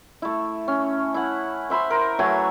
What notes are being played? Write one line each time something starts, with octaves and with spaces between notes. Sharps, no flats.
A3 E4
C#4
E4 F#5
C5 E5 B5 C6
A#4 C5
F#3 A3 B4 G#5